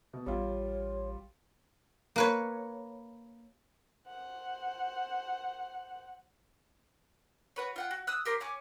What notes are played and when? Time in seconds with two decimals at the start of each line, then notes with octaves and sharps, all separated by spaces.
0.13 B2
0.26 A1 G3 F4 C#5
2.16 A#3 B4 C#5
4.08 C5 F#5
7.56 F#4 B4 C#5
7.76 F4 F#5 G5
7.91 F#4
8.07 D#6 E6 F#6
8.25 G4 A#4 C5 C6
8.40 C#4 C#5 G#5 D6